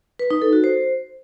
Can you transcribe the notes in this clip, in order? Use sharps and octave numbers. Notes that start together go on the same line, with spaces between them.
B4
D#4
A4
F#4
C5